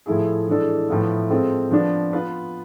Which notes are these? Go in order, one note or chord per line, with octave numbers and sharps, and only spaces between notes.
A2 F3 A3 E4 G#4
E3 G#3 D4 A4
A2 F3 B3 E4
G#3 C4 F4 A4
F3 B3 D4
B3 F4 B4